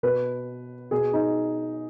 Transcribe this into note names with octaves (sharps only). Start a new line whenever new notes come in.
B2 B4
B2 G#4
D#4